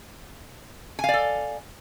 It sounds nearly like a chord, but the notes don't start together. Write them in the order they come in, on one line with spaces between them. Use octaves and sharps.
G#5 F5 D5 A4